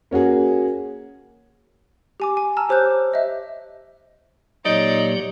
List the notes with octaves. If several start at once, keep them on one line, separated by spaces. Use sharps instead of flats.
A#3 C#4 F#4 G#4
G4 G#5 D6
G#5
A5 A#5 E6 F6
G4 C5 C#5 F#6 G6
D6
C5 D#5 E5
A#2 F#3 D#4 G4 C#5 D5